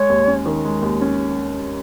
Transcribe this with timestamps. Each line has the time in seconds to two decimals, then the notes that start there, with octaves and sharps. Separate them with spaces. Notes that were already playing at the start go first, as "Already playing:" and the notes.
Already playing: G#3 C#5
0.10 D#2
0.27 C#4
0.46 D#3
0.65 G#3
0.82 D#2
1.01 C#4